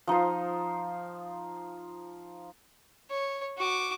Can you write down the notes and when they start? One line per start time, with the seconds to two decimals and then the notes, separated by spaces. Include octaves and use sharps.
0.07 F3 D#4 F4 C5
3.10 C#5
3.58 F#4 D6